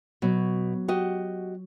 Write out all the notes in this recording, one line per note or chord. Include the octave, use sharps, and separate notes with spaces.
B2 F#3
F#4 G4 D#5